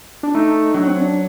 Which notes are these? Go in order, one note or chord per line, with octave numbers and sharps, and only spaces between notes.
D4
A3 D#4
F#3 D4
C4
D4